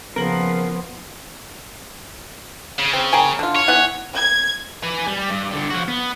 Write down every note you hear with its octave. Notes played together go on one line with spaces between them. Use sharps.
C#3 F3 A#3 B3 A#4 F#7
C#3
C4
A#3 G5 G#5
D3 F4
C#5
E3 B3 F#5
G#6
B4 G#5
G3
G2
G2 D3
F3 F#4
B3